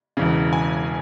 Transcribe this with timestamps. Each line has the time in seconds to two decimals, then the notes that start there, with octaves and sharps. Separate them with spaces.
0.17 E1 E2 C#3
0.53 G#5